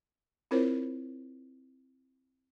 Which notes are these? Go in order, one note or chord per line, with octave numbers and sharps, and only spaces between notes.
C4 E4 F4 A#4 C5 C#5